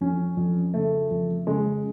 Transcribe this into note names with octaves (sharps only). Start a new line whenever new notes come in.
F2 C#4
F2
C#3 A3
F2
C#3 G#3